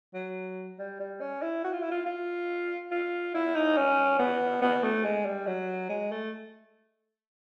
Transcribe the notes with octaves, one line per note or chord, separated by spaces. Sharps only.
F#3
G3
G3
C#4
E4
F#4
F4
E4
F4
F4
F4
E4
D#4
C#4
B3
B3
A3
G#3
G3
F#3
G#3
A3